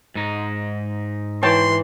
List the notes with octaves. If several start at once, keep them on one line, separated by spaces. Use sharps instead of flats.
G#2 D#4
E3 C#5 G5 A5 C6